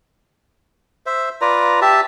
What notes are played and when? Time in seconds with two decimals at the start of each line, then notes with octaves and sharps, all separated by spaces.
1.06 C5 E5
1.41 F4 B4 D5 A#5
1.81 G4 E5 A5